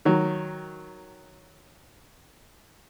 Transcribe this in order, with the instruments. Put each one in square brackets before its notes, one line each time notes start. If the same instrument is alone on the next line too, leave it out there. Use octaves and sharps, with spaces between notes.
[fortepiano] D#3 F#3